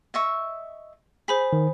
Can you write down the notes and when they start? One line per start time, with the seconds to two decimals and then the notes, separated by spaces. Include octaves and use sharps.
0.14 D#5 E5 C#6
1.28 G#4 C5 B5 B6
1.53 D#3